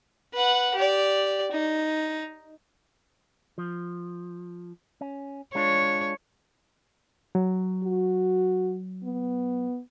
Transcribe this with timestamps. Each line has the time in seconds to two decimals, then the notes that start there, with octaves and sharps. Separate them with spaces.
0.34 B4 F#5
0.75 G4 D5
1.51 D#4
3.58 F3
5.01 C#4
5.55 G#3 D4 F4 C#5
7.35 F#3
7.84 F#4
9.04 B3